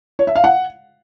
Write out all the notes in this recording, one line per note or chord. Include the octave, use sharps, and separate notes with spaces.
C#5
E5
F5
F#5